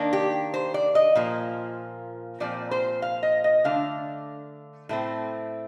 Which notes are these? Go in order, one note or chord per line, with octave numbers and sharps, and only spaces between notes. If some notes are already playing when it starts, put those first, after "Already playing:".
Already playing: D#3 A#3 D4
G4
C5
D5
D#5
A#2 F3 A#3
A#2 F3 C4 D5
C5
F5
D#5
D#5
D3 A3 D4 F5
A2 A3 C4